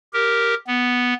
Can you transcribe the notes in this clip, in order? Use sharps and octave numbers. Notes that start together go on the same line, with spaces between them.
G4 A#4
B3